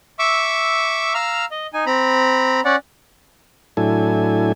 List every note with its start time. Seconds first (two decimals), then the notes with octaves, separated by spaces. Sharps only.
0.19 E5 C#6 D6 E6
1.14 F5 A#5 E6 F6
1.51 D#5
1.73 D#4 G#5
1.86 C4 A#5 B5
2.65 C#4 D5 F#5
3.77 A2 F#3 D4 E4 A4 G#5